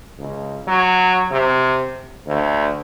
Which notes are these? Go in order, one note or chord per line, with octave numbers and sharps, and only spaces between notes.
C#2
F#3
C3
D2